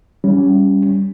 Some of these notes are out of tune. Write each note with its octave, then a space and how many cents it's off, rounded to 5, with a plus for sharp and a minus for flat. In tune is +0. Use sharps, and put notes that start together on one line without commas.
G3 +0 C#4 +10